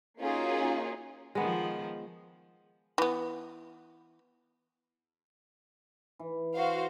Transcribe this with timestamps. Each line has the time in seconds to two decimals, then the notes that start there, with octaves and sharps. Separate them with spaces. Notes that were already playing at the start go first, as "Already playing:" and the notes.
0.19 A#3 C#4 D#4 F4 F#4 G#4
1.35 D#3 F3 G#3 B3
2.98 E3 B3
6.19 E3
6.55 F#4 C5 F5